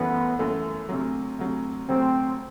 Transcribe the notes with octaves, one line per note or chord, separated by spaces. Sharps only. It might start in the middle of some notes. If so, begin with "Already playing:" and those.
Already playing: G1 F#2 E3 A3 B3
G1 F#2 E3 A3
D2 C3 F#3
D2 C3 F#3
D2 C3 F#3 C4